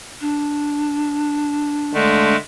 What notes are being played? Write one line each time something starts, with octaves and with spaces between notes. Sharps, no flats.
D4
D3 G#3 A3